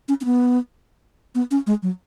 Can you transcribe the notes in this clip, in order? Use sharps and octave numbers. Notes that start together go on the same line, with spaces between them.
C#4
C#4
B3
B3
C#4
G#3
F#3